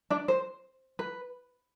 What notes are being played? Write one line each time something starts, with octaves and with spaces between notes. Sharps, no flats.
D4 D5
C5
B4